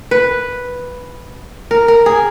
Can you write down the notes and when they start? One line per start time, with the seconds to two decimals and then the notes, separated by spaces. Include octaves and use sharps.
0.11 B4
1.71 A#4
1.88 A#4
2.06 G#4